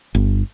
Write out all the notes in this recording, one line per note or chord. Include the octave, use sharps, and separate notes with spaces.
G1